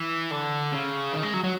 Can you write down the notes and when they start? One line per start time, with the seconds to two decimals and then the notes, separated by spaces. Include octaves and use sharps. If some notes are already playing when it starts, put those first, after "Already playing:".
Already playing: E3
0.31 D3
0.72 C#3
1.13 D#3
1.23 G#3
1.34 F#3
1.44 F#3